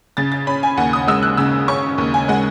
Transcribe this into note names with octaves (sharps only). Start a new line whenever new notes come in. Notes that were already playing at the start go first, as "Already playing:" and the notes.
C#3 A6
A6
C#4 B5
G#5
D#2 F#5
D#6
G#3 E6
F#6
C#3 E6
C#4 C#6
D#2
G#5
G#3 F#5